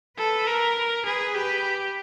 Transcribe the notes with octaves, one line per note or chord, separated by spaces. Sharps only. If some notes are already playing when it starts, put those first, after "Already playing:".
A4 B4
A#4
G#4 B4
G4 B4